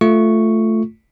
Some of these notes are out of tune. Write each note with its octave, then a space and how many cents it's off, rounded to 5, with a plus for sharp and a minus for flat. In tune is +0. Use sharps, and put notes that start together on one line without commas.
A3 +0 F4 +0 C#6 +0